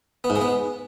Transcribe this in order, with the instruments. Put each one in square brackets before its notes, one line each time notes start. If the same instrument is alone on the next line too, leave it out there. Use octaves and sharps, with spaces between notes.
[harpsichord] B3
G#2
G#3
B3